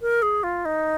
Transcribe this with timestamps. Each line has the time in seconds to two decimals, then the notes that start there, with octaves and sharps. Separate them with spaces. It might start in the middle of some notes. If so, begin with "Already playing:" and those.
0.02 A#4
0.22 G#4
0.43 F4
0.65 D#4